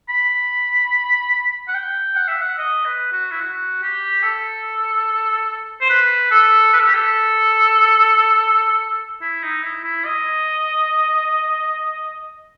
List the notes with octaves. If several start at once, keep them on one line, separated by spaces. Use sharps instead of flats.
B5
F#5
G5
F#5
E5
F#5
D#5
B4
F#4
E4
F#4
G4
A4
C5
B4
A4
B4
A4
G4
A4
E4
D#4
E4
E4
D#5